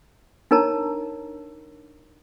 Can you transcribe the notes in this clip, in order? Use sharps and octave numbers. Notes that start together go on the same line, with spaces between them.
D4 D#4 A#4 C#5 A5 A#5